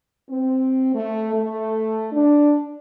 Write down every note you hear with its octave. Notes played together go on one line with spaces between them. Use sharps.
C4
A3
A3
D4